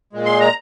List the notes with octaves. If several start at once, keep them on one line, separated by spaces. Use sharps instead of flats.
A#2 G#3
C6
A#5